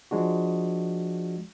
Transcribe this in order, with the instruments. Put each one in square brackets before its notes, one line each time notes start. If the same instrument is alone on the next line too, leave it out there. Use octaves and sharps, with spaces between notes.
[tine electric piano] F3 G#3 D4 F#4